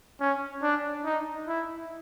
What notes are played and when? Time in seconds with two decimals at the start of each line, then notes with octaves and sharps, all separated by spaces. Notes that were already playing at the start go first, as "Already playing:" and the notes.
0.21 C#4
0.62 D4
1.05 D#4
1.48 E4